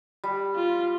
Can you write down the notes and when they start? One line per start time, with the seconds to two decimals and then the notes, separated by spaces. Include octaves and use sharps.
0.24 G3
0.56 F4